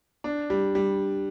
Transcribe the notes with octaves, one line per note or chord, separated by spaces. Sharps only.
D4
G3
G3